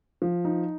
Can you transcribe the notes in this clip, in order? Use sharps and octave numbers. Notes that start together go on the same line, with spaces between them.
F3
D#4